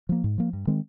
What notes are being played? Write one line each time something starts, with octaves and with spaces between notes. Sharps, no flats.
F3 A#3
G#2
F3 A#3
G2
D#3 G#3 C4